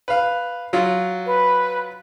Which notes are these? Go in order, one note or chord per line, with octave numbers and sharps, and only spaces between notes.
B4 F5
F#3 F4
B4